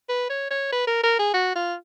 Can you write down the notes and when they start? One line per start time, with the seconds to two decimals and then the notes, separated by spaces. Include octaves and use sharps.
0.09 B4
0.30 C#5
0.51 C#5
0.72 B4
0.87 A#4
1.03 A#4
1.19 G#4
1.34 F#4
1.55 F4